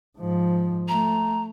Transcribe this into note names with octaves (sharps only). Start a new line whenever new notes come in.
G#2 F3
A3 A#5